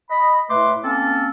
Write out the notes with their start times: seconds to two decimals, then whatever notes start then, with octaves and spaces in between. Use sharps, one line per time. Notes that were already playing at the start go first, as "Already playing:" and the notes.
0.10 D#5 B5
0.50 A2 A3 B4 C6 D6
0.84 A#3 C4 C#4 A4